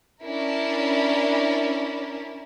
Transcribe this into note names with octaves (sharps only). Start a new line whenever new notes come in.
C#4 D4 E4 A#4